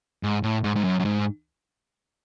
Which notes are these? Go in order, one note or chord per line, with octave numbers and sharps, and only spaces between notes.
G#2
A2
G#2
G#2
F#2
F#2
G#2